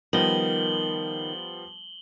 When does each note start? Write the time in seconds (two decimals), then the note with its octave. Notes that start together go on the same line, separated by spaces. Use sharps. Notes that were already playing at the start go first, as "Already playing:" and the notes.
0.13 D#3 F3 G3 B3 F#7 G7